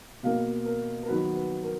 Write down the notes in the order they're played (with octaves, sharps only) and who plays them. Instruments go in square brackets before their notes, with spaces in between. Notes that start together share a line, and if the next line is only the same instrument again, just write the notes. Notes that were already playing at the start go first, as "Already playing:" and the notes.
[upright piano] B2 A#3 F5
A#4
A#4
D#3 F#3 B3 B4
B4
A#4